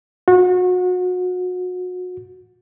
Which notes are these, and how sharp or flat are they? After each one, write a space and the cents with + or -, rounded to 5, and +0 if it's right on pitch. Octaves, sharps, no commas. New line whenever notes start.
F#4 -30